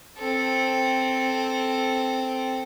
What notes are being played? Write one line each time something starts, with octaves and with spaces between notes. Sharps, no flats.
C4 A4